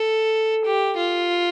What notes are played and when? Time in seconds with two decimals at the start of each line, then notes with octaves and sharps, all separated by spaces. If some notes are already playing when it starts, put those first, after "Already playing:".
Already playing: A4
0.65 G4
0.97 F4